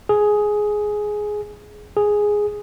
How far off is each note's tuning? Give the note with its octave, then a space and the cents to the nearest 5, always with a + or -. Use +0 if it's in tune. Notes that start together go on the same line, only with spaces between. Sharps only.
G#4 +10
G#4 +0